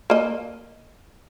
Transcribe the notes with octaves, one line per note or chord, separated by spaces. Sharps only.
A#3 D#5